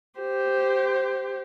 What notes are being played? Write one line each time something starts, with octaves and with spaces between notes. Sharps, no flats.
G4 C5